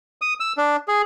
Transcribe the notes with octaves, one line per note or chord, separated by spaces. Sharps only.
D#6
E6
D4
G#4